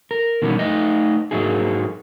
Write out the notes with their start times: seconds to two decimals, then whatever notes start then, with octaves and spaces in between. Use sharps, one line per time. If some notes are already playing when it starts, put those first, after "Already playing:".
0.11 A#4
0.42 B2 D#3 E3 G3 B3 C#4
0.59 A3 D#4 B4 D#5
1.31 G#2 F#3 A#3 D#4 G#4